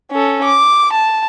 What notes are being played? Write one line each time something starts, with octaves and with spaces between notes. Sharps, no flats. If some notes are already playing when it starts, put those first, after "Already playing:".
C#4 A4
D6
A5